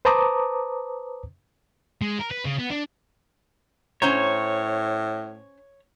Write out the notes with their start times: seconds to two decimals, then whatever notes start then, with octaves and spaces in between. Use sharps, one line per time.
0.05 B4 C5 A5 A#5 D6 D#6
2.01 G#3
2.19 A#4
2.31 B4
2.45 C#3
2.59 B3
2.70 D4
4.02 A2 C#4 C5 C#5 A#5